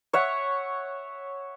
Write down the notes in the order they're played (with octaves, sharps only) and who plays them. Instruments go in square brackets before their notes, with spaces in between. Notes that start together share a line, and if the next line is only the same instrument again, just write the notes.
[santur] C#5 E5 F#5